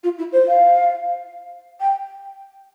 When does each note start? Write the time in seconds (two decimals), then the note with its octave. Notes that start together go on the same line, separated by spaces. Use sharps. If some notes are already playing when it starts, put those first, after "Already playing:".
0.04 F4
0.18 E4
0.32 C5
0.48 F5
1.80 G5